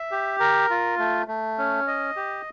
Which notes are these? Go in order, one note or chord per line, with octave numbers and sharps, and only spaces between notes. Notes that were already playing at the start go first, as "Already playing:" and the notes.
Already playing: E5
G4
A#4
F4
A3
A3
C#4
D#5
G4